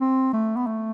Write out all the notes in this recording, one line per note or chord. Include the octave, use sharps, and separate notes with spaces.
C4
A3
B3
A3